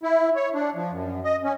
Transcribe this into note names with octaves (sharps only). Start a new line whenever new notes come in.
E4
C#5
D4
F3
F#2
D#5
C#4